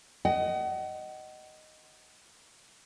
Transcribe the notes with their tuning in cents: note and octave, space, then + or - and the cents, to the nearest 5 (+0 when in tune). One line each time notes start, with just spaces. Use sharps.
D#5 +0 F#5 +35